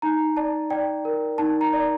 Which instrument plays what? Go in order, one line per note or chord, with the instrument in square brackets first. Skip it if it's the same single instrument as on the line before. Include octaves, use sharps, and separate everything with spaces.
[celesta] D#4 A#5
D5 A5
D5 G5
A#4
D#4 A5
A#5
D5